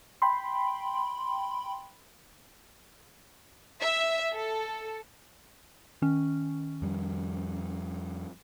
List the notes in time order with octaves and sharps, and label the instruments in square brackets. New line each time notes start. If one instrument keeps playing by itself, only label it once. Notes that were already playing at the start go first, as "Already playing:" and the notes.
[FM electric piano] G5 B5 C6
[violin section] E5
A4
[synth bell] D#3 C#4
[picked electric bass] F2 G3